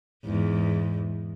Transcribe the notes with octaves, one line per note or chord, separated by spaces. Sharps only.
E2 G#2